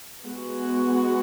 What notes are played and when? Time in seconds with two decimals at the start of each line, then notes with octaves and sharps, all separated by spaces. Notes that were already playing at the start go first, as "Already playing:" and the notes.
0.25 G#3 B3 F#4